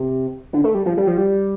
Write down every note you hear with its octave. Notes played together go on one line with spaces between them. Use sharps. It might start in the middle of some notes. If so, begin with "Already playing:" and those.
Already playing: C3
D3
A3
G3
F3
G3
F3
G3